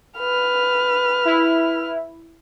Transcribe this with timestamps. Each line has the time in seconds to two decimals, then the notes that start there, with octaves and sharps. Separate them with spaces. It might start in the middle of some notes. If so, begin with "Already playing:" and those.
0.18 B4 F6
1.25 E4